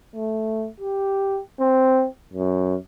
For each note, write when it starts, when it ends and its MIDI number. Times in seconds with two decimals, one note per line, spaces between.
0.15 0.68 57
0.80 1.40 67
1.60 2.07 60
2.33 2.76 42